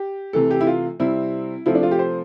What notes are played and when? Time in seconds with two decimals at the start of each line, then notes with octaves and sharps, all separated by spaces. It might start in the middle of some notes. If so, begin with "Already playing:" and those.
Already playing: G4
0.33 C3 E3 A3 A4
0.51 G4
0.61 E4
0.67 F4
1.00 C3 G3 C4 E4
1.66 C3 F3 A3 C4 E4
1.75 D4
1.83 F4
1.91 G4
1.99 C5